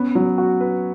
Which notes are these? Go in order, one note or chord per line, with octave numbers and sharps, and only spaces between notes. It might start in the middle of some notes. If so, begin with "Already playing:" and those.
Already playing: B3 C#4
F#3
F#4
B4